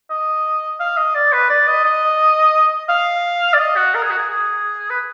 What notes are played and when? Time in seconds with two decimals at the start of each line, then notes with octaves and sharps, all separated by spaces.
0.10 D#5
0.80 F5
0.97 D#5
1.15 D5
1.32 B4
1.49 D5
1.67 D#5
1.84 D#5
2.89 F5
3.54 D5
3.59 D#5
3.76 F#4
3.94 A#4
4.02 G#4
4.10 F#4
4.18 G#4
4.29 G#4
4.90 B4